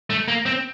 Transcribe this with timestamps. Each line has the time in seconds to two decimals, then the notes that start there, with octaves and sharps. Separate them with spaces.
0.10 A3
0.28 A#3
0.46 C4